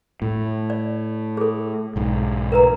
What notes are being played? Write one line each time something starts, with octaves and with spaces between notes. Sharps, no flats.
A2
D5
G#4 A4
B1 G#2
A#4 B4 A#5